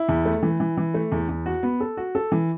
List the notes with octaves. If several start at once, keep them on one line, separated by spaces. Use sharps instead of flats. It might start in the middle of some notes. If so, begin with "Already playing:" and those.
Already playing: E4
E2
A3
E3
E3
E3
A3
E2
E2
F#4
B3
A4
F#4
A4
E3